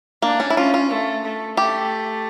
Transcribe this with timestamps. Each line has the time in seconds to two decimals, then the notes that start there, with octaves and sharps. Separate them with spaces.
0.22 A#3 D4
0.40 C#4
0.50 E4
0.56 C#4 F4
0.74 F4
0.90 A3
1.25 A3
1.57 A3 G4